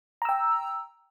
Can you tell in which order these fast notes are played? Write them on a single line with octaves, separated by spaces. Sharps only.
A#5 E6 G5